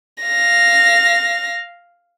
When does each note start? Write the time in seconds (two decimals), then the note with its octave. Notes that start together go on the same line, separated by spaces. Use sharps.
0.23 F5 A#6